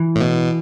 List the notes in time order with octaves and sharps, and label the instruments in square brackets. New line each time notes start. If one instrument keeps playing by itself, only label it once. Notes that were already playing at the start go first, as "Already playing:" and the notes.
Already playing: [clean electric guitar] E3
[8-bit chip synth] A2
B2